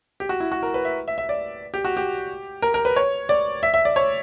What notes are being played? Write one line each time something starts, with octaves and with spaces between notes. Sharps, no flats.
G4
F#4
E4
F#4
A#4
B4
E5
E5
E5
D5
G4
F#4
G4
A#4
A#4
B4
C#5
D5
E5
E5
D5
C#5